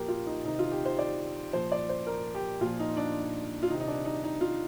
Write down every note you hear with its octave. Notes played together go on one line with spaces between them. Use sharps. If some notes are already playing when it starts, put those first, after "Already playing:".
Already playing: A#2 F3 G4 A#4
F4
D#4
C3 D#3 D#4
F4
G4
C5
D5
A#2 F3 C5
D5
C5
A#4
G4
A#2 F3 F4
D#4
D4
F4
D#3 D#4
C3
D#4
D4
D#4
D#4
F4